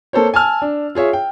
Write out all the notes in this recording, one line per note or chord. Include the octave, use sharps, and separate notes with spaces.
A#3 A4 C5 C#5
G#5 A5 E6 F6
D4
F4 G#4 C#5 E5
G5